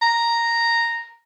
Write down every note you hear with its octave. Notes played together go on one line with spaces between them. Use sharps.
A#5